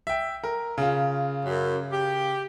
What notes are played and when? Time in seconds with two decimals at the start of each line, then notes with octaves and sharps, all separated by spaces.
0.07 E5 G5
0.44 A#4
0.78 C#3 F4
1.45 F#2
1.92 G4